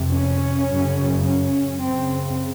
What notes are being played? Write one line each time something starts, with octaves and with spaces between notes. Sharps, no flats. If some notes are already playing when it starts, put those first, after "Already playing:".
Already playing: F2 C3
C#4
F#2 C#3
C#4
F#2 C#3 C4